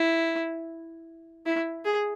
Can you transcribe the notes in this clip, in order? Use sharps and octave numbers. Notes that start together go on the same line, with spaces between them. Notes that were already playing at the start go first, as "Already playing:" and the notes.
Already playing: E4
E4
G#4